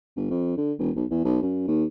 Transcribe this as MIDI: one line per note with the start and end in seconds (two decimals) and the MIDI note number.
0.16 0.29 31
0.30 0.55 41
0.57 0.73 50
0.78 0.91 28
0.96 1.05 35
1.10 1.21 40
1.25 1.40 35
1.42 1.66 42
1.68 1.84 39